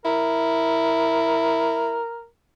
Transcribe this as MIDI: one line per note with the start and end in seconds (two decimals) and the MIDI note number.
0.05 2.01 64
0.05 2.26 70